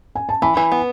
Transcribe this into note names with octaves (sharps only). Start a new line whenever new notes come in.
G#5
A5
E3 B5
E3
B3